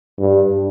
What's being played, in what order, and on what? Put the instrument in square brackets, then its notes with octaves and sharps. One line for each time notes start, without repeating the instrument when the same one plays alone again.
[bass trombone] G2